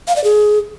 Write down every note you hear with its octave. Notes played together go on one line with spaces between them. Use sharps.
F5
D5
G#4